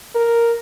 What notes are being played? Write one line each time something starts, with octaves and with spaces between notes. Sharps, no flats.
A#4